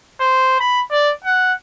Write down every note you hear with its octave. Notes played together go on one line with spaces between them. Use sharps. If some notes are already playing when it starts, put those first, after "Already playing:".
C5
B5
D5
F#5